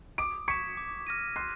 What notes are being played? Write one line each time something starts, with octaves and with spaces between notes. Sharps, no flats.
D6 D#6 D7
C#6 G#6 B6 C#7 E7
D6
F6 A#6 D#7
C6 F#6 C7